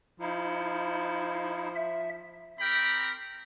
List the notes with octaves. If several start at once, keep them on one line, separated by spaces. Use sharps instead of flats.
F3 D#4 E4
E5
C4 G4 A#4 G5 A#5 B5